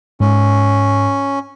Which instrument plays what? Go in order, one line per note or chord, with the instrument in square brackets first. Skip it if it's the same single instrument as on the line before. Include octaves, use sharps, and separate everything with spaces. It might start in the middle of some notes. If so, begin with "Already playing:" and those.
[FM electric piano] G#2 [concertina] C#4